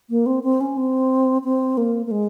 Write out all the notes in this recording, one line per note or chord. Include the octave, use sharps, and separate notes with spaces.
A#3
C4
C4
C#4
C4
C4
A#3
A#3
G#3